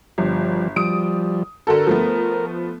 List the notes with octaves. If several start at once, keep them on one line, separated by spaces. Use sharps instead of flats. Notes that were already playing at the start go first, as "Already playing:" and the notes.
G1 F3 G3
F3 G3 D#6 D7
D3 F#4 A4 A#4
F3 A3 B3